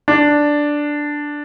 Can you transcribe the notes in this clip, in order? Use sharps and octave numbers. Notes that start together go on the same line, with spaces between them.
D4